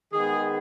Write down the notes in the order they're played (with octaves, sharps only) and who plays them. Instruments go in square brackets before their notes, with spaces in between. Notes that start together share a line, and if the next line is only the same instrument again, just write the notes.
[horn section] D#3 G#3 B3 G#4